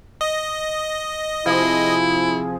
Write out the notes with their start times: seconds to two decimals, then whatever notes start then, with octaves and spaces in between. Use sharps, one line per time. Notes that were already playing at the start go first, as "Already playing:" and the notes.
0.21 D#5
1.46 C3 F3 E4 G#4